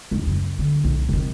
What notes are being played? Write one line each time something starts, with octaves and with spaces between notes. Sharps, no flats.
E1 D#2
F#2 C#3
D3
B1
C3 D#3